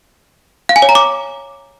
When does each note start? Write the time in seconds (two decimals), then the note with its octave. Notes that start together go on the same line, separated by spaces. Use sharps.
0.69 F5
0.76 G#5
0.82 C#5
0.89 A#5
0.95 D6